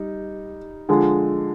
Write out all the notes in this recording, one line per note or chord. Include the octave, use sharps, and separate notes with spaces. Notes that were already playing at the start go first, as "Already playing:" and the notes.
Already playing: G3 D#4
D3 F3 G#3